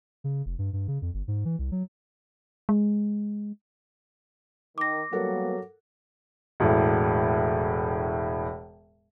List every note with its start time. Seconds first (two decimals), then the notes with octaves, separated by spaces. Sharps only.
0.24 C#3
0.46 F1
0.59 G2
0.73 G2
0.88 C#3
1.02 F2
1.14 G1
1.28 G#2
1.45 E3
1.59 C2
1.72 F#3
2.69 G#3
4.78 D#3 D6 A#6
5.13 F#3 G3 A#3 B3 A4 A#4 F#5
6.60 E1 A2